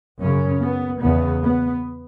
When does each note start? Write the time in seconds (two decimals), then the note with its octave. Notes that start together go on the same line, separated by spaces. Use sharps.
0.21 F#2 C#3 C#4
0.62 B3
1.01 E2 C#3 B3
1.42 B3